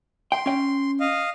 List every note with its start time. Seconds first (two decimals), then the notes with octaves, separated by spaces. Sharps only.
0.32 G5 C6
0.46 C#4 G5
1.00 D#5 F5